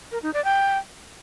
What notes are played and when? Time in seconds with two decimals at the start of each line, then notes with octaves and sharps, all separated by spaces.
0.12 A#4
0.23 D#4
0.34 D5
0.44 G5